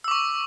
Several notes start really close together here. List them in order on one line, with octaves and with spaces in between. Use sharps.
E6 D6 C#6